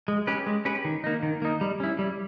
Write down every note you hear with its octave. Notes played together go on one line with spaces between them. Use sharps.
G#3
C#4 G4 B4
G#3
C#4 G4 B4
D#3
A#3 D#4
D#3
A#3 D#4
G3
C#4 E4
G3